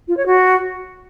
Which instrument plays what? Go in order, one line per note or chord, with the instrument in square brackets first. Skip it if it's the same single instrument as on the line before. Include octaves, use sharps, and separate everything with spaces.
[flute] F4
C#5
F#4